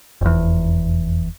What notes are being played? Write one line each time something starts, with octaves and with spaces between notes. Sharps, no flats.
F1 E2